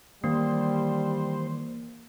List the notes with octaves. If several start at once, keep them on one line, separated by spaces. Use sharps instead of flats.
D#3 E3 G3 A#3 D4 C5